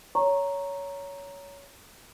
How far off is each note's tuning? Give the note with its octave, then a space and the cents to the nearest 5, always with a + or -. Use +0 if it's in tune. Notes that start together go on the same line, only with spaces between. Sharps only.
C#5 +20 A#5 +0 C#6 -15